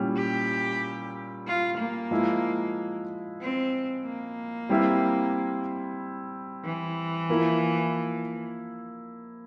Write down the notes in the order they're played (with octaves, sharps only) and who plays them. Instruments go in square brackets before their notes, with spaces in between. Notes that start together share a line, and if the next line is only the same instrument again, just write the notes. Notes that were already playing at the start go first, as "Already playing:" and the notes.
Already playing: [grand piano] A#2 G3 C#4 E4
[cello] G4
F4
A#3
[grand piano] F3 G#3 E4
[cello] C4
A#3
[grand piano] G3 C4 E4
[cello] E3
[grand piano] F3 A#3 E4